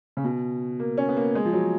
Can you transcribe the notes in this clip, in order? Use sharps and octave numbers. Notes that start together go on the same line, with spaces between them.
C#3
B2
A#3
C#4
B3
A#3
G#3
F3
F#3